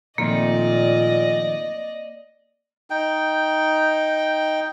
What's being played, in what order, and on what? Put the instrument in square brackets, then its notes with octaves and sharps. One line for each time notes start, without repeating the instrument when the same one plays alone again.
[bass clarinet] A#2 [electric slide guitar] D#3 F3 A3 [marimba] A#3 C4 [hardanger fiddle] D5 D#5
[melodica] D#4 G5